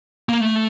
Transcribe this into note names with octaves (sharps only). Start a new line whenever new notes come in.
A#3
A3